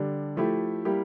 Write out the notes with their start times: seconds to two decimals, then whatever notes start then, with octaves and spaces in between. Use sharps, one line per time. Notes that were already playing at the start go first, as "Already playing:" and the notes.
Already playing: D3 G3 D4
0.36 F3 A3 E4 G4
0.85 G3 A#3 E4 G4